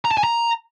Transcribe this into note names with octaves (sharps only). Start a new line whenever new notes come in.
A#5
A5
G#5
A#5